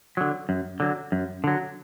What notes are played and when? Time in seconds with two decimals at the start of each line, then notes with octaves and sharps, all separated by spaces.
0.17 D3 F#3
0.49 F#2
0.80 D3 F#3
1.12 F#2
1.44 D3 F#3